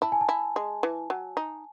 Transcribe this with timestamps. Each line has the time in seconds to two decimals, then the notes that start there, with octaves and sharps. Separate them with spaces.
0.02 E4 A5
0.12 G#5
0.21 A5
0.29 E4
0.56 G#3
0.83 E3
1.10 F#3
1.37 D#4